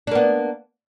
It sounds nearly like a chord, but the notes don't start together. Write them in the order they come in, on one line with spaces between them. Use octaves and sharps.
D4 A#3 B3